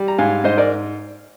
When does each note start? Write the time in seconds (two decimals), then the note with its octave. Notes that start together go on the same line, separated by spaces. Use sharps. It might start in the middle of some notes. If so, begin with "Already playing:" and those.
Already playing: G3
0.08 A#5
0.18 G#2 F5 G#5
0.44 G#2 C5 D#5
0.57 A#4 D5